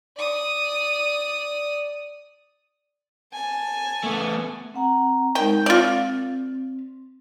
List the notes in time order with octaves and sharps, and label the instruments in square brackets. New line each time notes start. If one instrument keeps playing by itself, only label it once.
[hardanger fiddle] D5 D#6
G#5 A5
[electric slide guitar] A3 B3
[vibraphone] C4 F#5 A#5
[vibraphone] G#3 D#4 A#4 [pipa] G5
[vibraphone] C4 [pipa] F4 D5